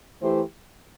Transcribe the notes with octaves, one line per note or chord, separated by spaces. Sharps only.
E3 A3 E4 G4 C5